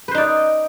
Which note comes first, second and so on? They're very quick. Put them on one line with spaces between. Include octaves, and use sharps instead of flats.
B4 C5 D#4 D5